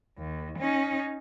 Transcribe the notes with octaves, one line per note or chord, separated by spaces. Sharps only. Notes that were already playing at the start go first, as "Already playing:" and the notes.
D#2
C#4 D#4